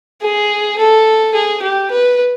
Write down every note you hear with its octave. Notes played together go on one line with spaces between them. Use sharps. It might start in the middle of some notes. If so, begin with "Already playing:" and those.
G#4
A4
G#4
G4
B4